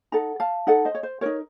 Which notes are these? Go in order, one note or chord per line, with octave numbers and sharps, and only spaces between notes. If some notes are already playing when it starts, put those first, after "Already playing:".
D#4 A4 F#5 A#5
F5 A5
D#4 A4 D#5 F#5
C5 D#5
C#5
C5
D#4 F#4 A#4 C#5